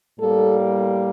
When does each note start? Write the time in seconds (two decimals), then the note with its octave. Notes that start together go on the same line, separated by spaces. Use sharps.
0.19 A2 G3 A#3 A4